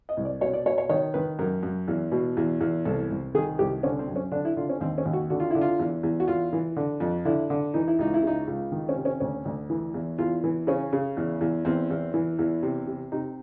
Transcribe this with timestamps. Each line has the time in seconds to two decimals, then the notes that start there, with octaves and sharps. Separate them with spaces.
0.09 D#5
0.17 C2
0.25 D5
0.41 B2 C#5
0.53 D5
0.66 B2 C#5
0.78 C#5
0.89 D#3 C#5
1.14 D#3 B4
1.39 F#2 A#4
1.63 F#2
1.88 E2
2.12 B2
2.37 E2
2.61 E2
2.85 C2 A4
3.10 C2
3.34 D#3 G#4
3.59 C2 G4
3.83 D3 C#4
3.99 C4
4.08 F#2
4.16 C#4
4.32 D3 D4
4.45 E4
4.57 D3 F4
4.69 C#4
4.81 D#2 C4
4.98 C#4
5.06 D#2
5.13 F#4
5.30 D3 F#4
5.40 F4
5.51 D3 E4
5.61 F4
5.79 E2
6.03 E2
6.20 F#4
6.27 E2 F4
6.53 E3
6.77 D3
7.00 F2
7.25 D3 E4
7.50 D3
7.74 E3 D#4
7.88 E4
7.99 C#2 D#4
8.14 E4
8.23 C#3 D#4
8.47 C#2
8.72 D#3
8.89 C#4
8.97 C3
9.05 C#4
9.20 D2 C#4
9.45 D2
9.70 E3
9.94 E2
10.18 E2 F4
10.44 E3
10.67 C#3 C#4
10.93 C#3
11.17 E2
11.41 E2
11.65 E2 C4
11.90 E2
12.14 E3
12.39 E2
12.63 C3
12.87 C3
13.12 C3 D#4